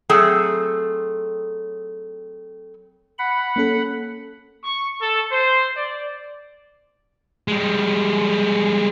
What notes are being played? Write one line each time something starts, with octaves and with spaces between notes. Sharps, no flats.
F#3 A3 C4 G#4 A4
F#5 B5
A#3 C#4 A4
C#6
A4
C5
D5
G3 G#3